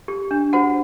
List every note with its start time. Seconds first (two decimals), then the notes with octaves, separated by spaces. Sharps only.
0.08 G4
0.31 D4
0.53 F#4 C5 F#5